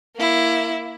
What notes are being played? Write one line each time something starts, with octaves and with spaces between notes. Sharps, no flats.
A#3 E4